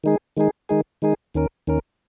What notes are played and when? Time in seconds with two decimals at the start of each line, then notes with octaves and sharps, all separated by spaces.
0.04 D#3 G#3 D#4 G#4
0.37 D#3 G#3 D#4 G#4
0.69 D#3 G#3 D#4 G#4
1.02 D#3 G#3 D#4 G#4
1.34 D#2 D#3 C#4 A#4
1.67 D#2 D#3 C#4 A#4